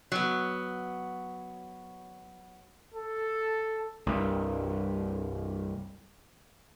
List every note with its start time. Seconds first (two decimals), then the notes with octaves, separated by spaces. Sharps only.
0.12 F#3 B3
2.94 A4
4.07 C2 G2